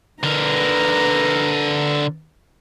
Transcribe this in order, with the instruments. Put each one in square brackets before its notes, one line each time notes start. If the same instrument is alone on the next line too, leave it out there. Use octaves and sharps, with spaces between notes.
[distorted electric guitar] D3 A#4 [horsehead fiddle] B4 A#5